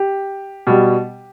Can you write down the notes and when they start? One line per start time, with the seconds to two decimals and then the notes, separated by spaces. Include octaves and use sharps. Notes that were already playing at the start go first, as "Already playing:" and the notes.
Already playing: G4
0.67 B2 G3